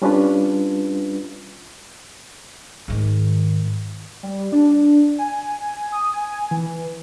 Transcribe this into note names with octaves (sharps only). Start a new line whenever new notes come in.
G3 C#4 D4 F4 B4
G#2 D#3
G3
D4
G#5
D#6
G#5
E3